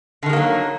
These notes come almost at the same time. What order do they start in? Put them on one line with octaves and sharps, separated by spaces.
D3 D#3 G#3 A#3 F#3